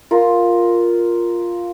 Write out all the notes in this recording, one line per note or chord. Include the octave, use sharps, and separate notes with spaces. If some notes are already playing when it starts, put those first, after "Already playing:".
F4 A#4